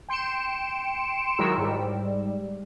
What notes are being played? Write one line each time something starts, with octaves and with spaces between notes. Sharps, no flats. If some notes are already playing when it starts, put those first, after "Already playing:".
G5 C6 C#7 D7 E7
D#3 F#3 G#3 E4 A#4 E6
G#2 G3